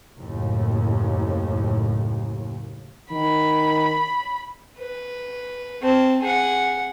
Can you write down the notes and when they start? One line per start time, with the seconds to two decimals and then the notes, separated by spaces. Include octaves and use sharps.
0.17 F#1 D#2 A2
3.12 D#3 B5
4.78 B4
5.82 C4 A5
6.22 G#4 F#5